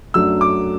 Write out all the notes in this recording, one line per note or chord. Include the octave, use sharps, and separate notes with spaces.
F#2 F#3 A3 D4 E6
D6